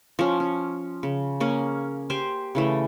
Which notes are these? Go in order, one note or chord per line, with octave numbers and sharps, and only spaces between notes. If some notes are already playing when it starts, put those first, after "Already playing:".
F3 C#4
C#4
C#3
A#3 C#4 G#4
G4 C5 G#5
C#3 E3 A3